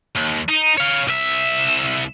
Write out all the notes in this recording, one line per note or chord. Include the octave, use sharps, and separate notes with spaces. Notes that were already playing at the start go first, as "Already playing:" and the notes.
D#2
D#4
C#5 F5
C2 E5